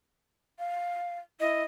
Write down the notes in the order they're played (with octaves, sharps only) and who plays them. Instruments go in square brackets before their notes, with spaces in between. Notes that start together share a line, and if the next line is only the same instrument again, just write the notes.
[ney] F5
[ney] E4 [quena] D#5